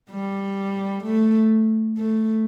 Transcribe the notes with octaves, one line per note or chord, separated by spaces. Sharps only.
G3
A3
A3